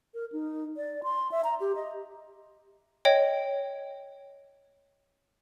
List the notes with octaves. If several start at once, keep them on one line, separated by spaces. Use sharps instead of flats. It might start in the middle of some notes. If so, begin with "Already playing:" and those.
A#4
D#4
D5
C6
E5
A#5
G4
D#5
C#5 D#5 G5